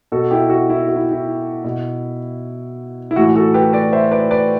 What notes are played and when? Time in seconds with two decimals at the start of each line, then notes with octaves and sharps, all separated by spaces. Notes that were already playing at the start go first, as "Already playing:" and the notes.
0.12 B2 F#4 A4
0.31 E4 G4
0.50 F#4
0.70 E4
0.88 F#4
0.96 E4
1.12 E4
1.64 B2
3.11 E4
3.16 A2 E3 F#4
3.35 F#4 A4
3.54 G4 B4
3.73 B4 D5
3.93 C5 E5
4.11 B4 D5
4.31 B4 D5